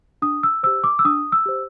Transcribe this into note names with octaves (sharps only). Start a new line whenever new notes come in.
D4 D#6
E6
G4 C5 E6
D6
E6
D4 D#6
E6
G4 C5